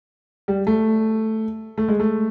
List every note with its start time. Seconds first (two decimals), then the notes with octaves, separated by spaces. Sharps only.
0.48 G3
0.67 A3
1.78 A3
1.88 G#3
2.00 A3